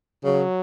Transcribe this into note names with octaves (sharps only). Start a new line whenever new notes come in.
C#3 F#3